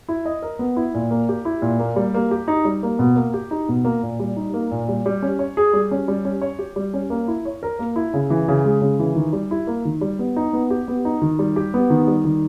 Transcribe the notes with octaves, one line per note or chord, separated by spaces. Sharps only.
E4
D#5
A#4
B3
E4
A#2
A#3
G4
E4
A#2
A#3
G3
A#3
G4
D#4
G3
A#3
B2
A#3
G4
D#4
B2
A#3
A#2
G3
D#4
A#3
A#2
G3
G3
C#4
C#5
G#4
G3
C#4
G3
C#4
C#5
G4
G3
C#4
A#3
E4
C#5
A#4
A#3
E4
C#3
E3
C#3
G#3
C#3
E3
D#3
G3
E4
A#3
D#3
G3
B3
D#4
B3
G4
B3
D#4
D#3
G3
G4
B3
D#3
G3
D#3